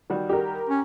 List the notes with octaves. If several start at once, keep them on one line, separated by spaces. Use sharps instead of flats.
D#3 G3 F#4
G4 A#4
C#4